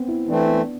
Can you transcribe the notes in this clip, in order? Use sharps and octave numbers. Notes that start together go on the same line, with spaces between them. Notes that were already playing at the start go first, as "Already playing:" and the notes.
Already playing: B3 C4
E4
E3 A3 C4 D4
B3